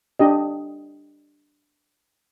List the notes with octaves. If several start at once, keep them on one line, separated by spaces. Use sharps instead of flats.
D4 G4 D#5